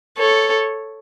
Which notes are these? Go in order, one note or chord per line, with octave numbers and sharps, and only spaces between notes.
A4 C#5